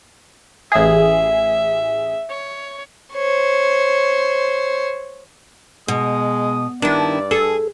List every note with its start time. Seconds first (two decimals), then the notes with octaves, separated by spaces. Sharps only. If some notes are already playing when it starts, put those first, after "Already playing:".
0.72 A1 G#4 E5
2.30 C#5
3.14 C5 C#5
5.88 B2 G#3 D#6
6.82 G2 D#3 D4 E4 D5
7.31 G#4 A4